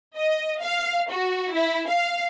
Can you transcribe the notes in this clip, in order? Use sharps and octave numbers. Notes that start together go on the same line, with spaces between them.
D#5
F5
F#4
E4
F5